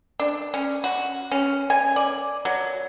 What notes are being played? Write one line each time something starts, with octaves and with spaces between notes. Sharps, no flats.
D4
C#4
F#4
C#4
G#5
D5
F#3